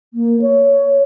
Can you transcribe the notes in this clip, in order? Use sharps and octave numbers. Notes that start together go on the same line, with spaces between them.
A#3
C#5